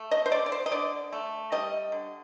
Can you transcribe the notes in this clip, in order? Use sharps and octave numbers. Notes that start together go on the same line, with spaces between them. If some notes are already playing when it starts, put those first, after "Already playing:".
Already playing: A3
D#5
C5
D3 D5
D5
C5
D#5
D3 D5
A3
G3 D#5
D3